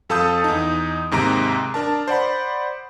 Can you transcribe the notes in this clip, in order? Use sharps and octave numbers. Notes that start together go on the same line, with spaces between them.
F2 A4 F5 A5 D#6 G6
E2 D#4
D#2 G#2 C3 A#5 D7
D4 A#4 A5
C5 D5 F#5 B5